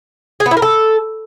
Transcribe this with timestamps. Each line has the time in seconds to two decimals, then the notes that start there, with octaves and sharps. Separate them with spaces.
0.40 G#4
0.46 B3
0.51 E4
0.57 A#4
0.62 A4